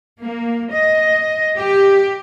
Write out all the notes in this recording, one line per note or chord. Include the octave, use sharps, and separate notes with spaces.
A#3
D#5
G4